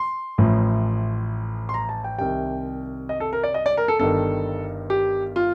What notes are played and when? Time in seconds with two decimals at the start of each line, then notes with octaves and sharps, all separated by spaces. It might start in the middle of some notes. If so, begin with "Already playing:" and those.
Already playing: C6
0.38 A1 A2 F3
1.69 C6
1.74 A#5
1.89 A5
2.04 G5
2.18 C2 C3 D#3 G3 G5
3.09 D#5
3.20 A4
3.33 A#4
3.43 D5
3.54 D#5
3.66 D5
3.77 A#4
3.88 A4
4.00 G1 G2 D#3 A4
4.90 G4
5.36 F4